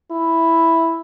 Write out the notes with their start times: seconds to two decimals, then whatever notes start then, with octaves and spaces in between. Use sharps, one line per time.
0.11 E4